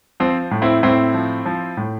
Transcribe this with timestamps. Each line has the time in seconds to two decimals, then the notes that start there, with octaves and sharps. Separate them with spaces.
0.20 F3 C4
0.51 A2
0.62 C4 E4
0.83 A2 C4 E4
1.14 F3
1.45 F3
1.77 A2